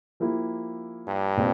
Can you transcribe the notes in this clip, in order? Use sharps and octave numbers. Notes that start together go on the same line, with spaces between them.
F3 A#3 E4 G4
G2
A#2 G#3 C4